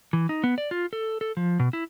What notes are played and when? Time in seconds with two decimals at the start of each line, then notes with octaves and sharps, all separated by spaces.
0.13 E3
0.29 D#4
0.44 B3
0.58 D5
0.71 F4
0.93 A4
1.21 A4
1.37 F3
1.60 B2
1.73 E4